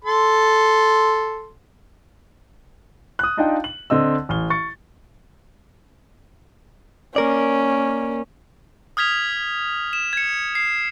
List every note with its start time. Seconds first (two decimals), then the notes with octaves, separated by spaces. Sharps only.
0.05 A4 C6
3.19 D#6 F#6
3.37 D4 D#4 F4 D#5 F5 G5
3.64 F#7
3.90 D3 C4 D#5 E6
4.29 A1 F6 G7
4.50 C#6 A6 C#7
7.16 A#3 C#4 A#4 D5
8.97 D#6 F6 G#6 B6 F7
9.93 E7
10.13 G#6 C#7
10.55 C7